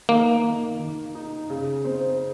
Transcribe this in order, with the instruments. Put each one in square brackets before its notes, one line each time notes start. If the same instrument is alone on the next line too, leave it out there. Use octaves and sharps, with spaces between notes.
[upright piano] D#3 [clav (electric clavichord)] A#3
[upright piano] D#3
D#3
D#4
C#3
C4